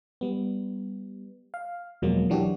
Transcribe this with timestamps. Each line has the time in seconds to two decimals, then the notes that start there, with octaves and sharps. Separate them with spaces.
0.21 G3 B3
1.54 F5
2.02 E2 B2 F3 F#3 G#3 A#3
2.30 E3 F#3 D4 F#4 G4